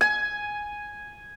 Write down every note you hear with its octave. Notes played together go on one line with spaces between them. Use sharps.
G#5